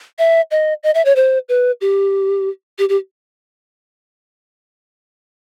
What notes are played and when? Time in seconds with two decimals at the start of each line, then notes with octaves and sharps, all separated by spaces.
0.19 E5
0.51 D#5
0.83 D#5
0.95 E5
1.05 C#5
1.16 C5
1.49 B4
1.81 G4
2.79 G4
2.89 G4